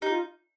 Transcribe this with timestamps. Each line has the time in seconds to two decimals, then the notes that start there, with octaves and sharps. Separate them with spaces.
0.02 D#4 G4
0.10 F4